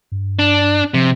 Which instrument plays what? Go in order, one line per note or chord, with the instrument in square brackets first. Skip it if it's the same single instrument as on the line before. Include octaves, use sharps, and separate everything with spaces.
[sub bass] G2
[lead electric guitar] D4
[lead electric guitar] C3 [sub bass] F3